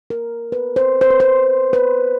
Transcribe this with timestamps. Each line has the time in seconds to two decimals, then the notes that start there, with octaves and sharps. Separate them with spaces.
0.10 A#4
0.52 B4
0.76 C5
1.01 C5
1.10 B4
1.20 C5
1.73 B4